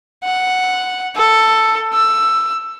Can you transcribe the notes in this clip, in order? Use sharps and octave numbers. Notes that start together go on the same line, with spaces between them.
F#5
A4
E6